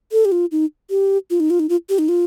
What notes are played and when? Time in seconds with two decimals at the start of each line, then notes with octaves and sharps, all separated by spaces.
0.12 A4
0.25 G4
0.32 F4
0.52 D#4
0.90 G4
1.30 F4
1.40 D#4
1.50 F4
1.60 D#4
1.69 F4
1.89 G4
1.99 D#4
2.09 F4